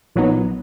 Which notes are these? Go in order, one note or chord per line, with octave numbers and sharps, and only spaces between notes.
A#1 A#2 F#3 B3 D#4